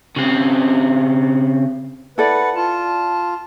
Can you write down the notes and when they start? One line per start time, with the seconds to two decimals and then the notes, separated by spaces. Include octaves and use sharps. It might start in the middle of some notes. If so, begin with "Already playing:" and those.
0.16 C#3 C4
2.18 E4 A4 B4 D5 F#5
2.56 F4 A5